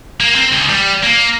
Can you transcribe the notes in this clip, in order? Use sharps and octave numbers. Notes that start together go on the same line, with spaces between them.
A#3
C4
C#2
G3
A#3